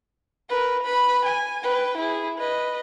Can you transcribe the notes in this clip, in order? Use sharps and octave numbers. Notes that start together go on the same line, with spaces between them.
A#4 B4
B4 B5
G#5
B4 G5
E4 G#4
B4 D#5